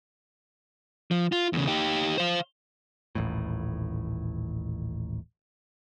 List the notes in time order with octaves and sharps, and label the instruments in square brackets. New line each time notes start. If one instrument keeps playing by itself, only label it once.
[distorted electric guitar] F3
F4
E2 C#3
D#4 G4
C5 F5
[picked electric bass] D#1 A1 A2